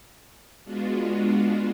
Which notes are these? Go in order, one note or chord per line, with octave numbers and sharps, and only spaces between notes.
G#3 B3 D4 F4 F#4